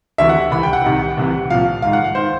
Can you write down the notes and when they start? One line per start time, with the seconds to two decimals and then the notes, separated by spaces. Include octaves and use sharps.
0.18 D2 C3 E3 E5
0.29 F#5
0.51 C2 C3 E3 B5
0.63 G5
0.73 F#5
0.84 C2 C3 D#3
1.17 C2 C3 E3
1.50 C2 A#2 F3 F5
1.82 G#2 D#3 F5
1.93 F#5
2.04 F5
2.15 D#3 C5